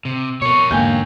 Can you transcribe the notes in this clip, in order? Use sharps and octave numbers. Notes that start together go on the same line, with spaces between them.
C3
B2 A#4 C#5 C#6
E2 G#2 D3 A#3 G5 G#5 G6